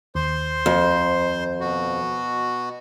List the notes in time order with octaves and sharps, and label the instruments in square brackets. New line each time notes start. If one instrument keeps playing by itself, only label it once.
[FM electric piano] D#2 [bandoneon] C5 C6
[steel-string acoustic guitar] F2
[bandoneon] B2 F#4